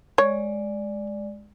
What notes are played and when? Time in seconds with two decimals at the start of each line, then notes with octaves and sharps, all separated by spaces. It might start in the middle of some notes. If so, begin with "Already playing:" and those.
0.18 G#3 C#5 D5